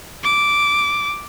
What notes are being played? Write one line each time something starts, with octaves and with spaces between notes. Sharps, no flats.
D6